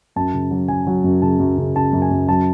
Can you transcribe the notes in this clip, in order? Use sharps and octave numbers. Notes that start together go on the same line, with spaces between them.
F#2 A5
C#3
F#3
F#3 G#5
F#3
F#2
C#3 A5
F#2
C#3
C#3 A5
F#2
G#5
F#2
F#3 A5